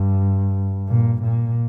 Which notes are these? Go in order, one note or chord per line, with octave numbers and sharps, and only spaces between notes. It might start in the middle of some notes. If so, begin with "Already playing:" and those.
Already playing: G2
A#2
A#2